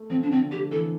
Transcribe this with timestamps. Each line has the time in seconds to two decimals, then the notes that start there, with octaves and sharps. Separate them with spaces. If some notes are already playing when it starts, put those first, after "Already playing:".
Already playing: A3
0.10 F3 C4
0.23 D4
0.31 D3 C4
0.51 D3 G4
0.71 E3 A4